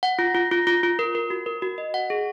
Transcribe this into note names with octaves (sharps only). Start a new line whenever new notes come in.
F#5
F4
F4
F4
F4
F4
A#4
A#4
F#4
A#4
F#4
D#5
F#5
G#4